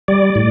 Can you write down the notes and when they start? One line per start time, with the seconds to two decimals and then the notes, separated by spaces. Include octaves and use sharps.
0.08 G3 D5
0.35 A2